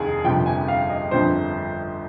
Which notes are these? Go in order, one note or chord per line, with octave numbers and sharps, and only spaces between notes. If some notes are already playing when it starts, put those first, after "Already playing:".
Already playing: F1 D#2 D#3 G#4
G1 F2 C3 F3 G5
G#5
F5
D#5
G1 F2 D3 F3 C5